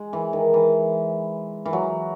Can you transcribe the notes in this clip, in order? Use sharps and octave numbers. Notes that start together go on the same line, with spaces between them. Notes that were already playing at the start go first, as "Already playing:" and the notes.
Already playing: G#3
E3
D#3
E3
E3
F#3